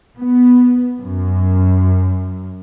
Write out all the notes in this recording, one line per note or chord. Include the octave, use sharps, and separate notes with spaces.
B3
F#2